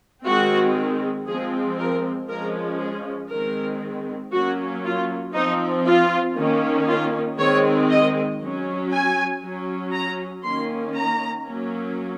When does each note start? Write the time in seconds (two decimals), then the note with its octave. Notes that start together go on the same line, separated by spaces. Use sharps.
0.25 D#3 G#3 C4 F#4
1.27 F3 G#3 C4 G#4
1.78 A#4
2.28 F3 G#3 C#4 A#4
2.80 G#4
3.31 D#3 G#3 C4 A#4
4.33 F#3 A#3 C#4 F#4
4.84 F4
5.34 F3 C4 D#4
5.85 F4
6.37 D#3 A#3 C#4
6.88 F4
7.39 D#3 G#3 C4 C#5
7.89 D#5
8.41 F#3 C#4
8.91 G#5
9.42 F#3 C#4
9.93 A#5
10.44 D#3 A#3 C#4 C6
10.95 A#5
11.46 F#3 A#3 C#4